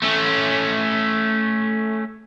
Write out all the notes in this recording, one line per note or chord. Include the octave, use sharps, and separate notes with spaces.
A3 C#4